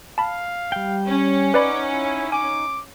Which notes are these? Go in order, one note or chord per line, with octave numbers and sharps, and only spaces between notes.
F5 A5 B5
G3 G5
C#4
D#4 B4 D5 F#5 B5 D6
E4
G#5 D6